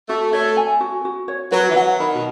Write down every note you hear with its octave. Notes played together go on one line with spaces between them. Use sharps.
A3 F#4
A3 C#5
G#5
F#4
F#4
C#5
F#3 B4
E3
F#3 F#5
D#3 B5
B2